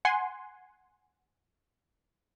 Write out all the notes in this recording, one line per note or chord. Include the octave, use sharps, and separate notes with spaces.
F#5 G#5 C6